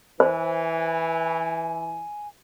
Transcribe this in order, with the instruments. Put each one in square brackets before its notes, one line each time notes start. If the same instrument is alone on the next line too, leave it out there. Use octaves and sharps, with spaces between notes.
[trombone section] E3 [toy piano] C5 [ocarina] G#5